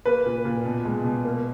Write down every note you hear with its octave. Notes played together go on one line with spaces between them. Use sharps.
A#3 B4
A#2
A#2
B2
G#3
B2
A#3